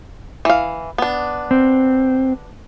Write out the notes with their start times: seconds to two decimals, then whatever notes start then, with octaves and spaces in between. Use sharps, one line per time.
0.45 E3 F5
0.98 B3 D4
1.51 C4